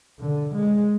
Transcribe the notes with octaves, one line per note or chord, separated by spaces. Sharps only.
D3
G#3